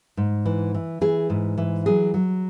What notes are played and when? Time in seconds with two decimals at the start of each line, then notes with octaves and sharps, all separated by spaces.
0.17 G#2
0.46 E3
0.74 E3
1.01 E3 G#4
1.30 G#2
1.58 E3
1.86 F#3 G#4
2.14 F#3